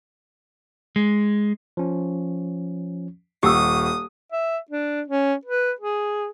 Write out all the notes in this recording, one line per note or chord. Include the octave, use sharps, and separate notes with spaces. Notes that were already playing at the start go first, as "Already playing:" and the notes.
G#3
F3 C#4
D#1 G4 C#6 D#6 E6
E5
D4
C#4
B4
G#4